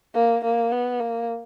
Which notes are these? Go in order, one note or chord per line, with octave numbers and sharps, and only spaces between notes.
A#3
A#3
B3
A#3